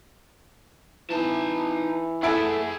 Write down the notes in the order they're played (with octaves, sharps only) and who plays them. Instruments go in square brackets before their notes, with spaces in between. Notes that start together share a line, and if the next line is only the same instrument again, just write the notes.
[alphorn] E3 [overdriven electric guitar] D#4 A5
[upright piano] E4 G#5 D7 [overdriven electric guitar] G#4 F#5 [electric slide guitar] A4 E5